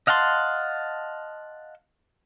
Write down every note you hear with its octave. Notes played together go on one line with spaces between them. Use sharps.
D#5 F5 F#5 A5 C6